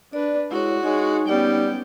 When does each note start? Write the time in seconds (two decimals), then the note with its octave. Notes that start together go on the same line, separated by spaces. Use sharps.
0.13 D4 B4 D5
0.51 G#3 E4 F#4 C#5
0.83 G#3 D#4 C#5
1.28 G3 B3 C#4 G5